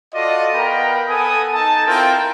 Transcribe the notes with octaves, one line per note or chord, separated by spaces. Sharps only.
F4 F#4 A4 D5 D#5
B3 A#4 F5 G5 A#5 B5
B3 A4 G#5 D#6
D#4 A4 G#5 A5
C4 E4 F4 A#4 G5